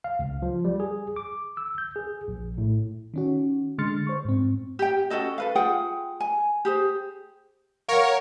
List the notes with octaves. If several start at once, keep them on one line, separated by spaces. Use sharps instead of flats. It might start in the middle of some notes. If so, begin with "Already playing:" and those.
F5
C#2
F3
G3
G#4
D6
E6
G6
G#4
A#1
A2
D#3 C#4 F#4
D3 G#3 C6 F6 A6 C#7
C5 C#6
G#2 C4
G4 G5
C#4 F#4 A4 D#5
A4 B4 F5
F4 G#4 F#5 G5
G#5
G4 G#4 C5
A#4 C#5 F5 F#5